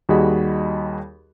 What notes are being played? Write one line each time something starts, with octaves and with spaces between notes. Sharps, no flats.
D#2 G3 F#4 G#4 D#5 B5